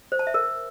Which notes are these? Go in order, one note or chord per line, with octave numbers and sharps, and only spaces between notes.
C5
A5
E5
A#4